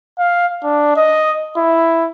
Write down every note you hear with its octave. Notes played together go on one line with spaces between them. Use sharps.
F5
D4
D#5
E4